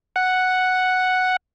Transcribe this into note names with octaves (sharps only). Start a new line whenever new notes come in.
F#5